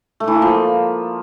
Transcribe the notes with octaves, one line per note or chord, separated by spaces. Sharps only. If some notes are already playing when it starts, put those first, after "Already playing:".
A3
E3
A#3
F3